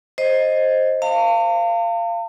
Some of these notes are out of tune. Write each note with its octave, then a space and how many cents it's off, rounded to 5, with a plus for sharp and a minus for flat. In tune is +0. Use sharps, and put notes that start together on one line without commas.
C5 +10 D#5 +0
F5 -20 A5 +45